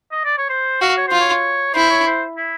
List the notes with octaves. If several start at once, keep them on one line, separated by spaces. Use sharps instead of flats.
D#5
D5
C#5
C5
F#4 F5
C#5
F4 C5
C#5
E4 C5
C#5
C5
E4